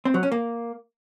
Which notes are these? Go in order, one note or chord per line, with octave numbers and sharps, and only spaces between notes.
C4
F#3
C#4
A#3